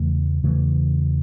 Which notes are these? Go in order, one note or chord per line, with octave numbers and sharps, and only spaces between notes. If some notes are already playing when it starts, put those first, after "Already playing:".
Already playing: E2 C#3 E3 A3
E2 C#3 E3 A3